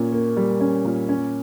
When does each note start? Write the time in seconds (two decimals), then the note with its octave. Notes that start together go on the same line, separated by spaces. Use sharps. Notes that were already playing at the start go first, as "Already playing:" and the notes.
Already playing: A#2 C#4
0.12 A#3
0.37 G3
0.60 C#4
0.85 A#2
1.09 C#4